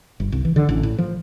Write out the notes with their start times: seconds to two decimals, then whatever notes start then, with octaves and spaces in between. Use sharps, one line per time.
0.20 G1
0.32 C2
0.45 E3
0.56 D3
0.69 A1
0.83 A2
0.98 F3